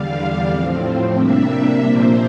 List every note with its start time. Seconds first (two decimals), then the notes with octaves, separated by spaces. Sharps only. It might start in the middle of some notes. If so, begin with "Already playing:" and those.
Already playing: E2 D3 G3 D4 F5
0.48 A2 F3 C4
1.16 C3 G3 A#3 D4 E5
1.84 A#2 F3 A#3 C5